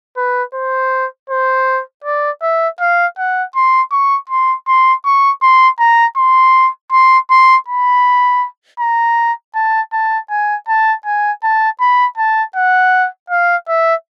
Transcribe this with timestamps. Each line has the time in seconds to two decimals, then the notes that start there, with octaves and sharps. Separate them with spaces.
0.17 B4
0.54 C5
1.30 C5
2.04 D5
2.42 E5
2.80 F5
3.18 F#5
3.55 C6
3.92 C#6
4.29 C6
4.67 C6
5.05 C#6
5.42 C6
5.79 A#5
6.17 C6
6.92 C6
7.31 C6
7.68 B5
8.80 A#5
9.55 A5
9.93 A5
10.30 G#5
10.68 A5
11.06 G#5
11.43 A5
11.80 B5
12.17 A5
12.56 F#5
13.30 F5
13.68 E5